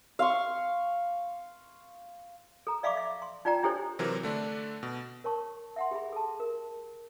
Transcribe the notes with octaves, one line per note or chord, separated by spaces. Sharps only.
F5 C6 C#6
A4 A#5
D5 E5 F5 B5 C#6 D6
E5
C6
D#4 F4 D5 G5 A#5
D4 E4 G4 A4 C5 C#5
C3 E3 F#3 C4 A#4
D3 A3 D4
B2
A#4 C#5 A5 C#6
E5 F#5 C6
G4 G#4 E5 B5
A4 A5
A#4